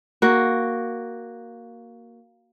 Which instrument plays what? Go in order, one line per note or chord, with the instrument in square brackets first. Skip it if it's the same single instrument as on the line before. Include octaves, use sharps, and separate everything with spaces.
[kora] A#3 F#4